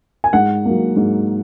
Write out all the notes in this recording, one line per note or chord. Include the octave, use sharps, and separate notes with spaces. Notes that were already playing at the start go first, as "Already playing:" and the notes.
G#5
G#2 F#5
F#3 A#3
G#2